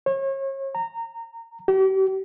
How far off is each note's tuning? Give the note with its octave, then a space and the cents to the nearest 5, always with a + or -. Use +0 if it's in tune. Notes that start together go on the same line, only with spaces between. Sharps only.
C#5 -35
A#5 -20
G4 -40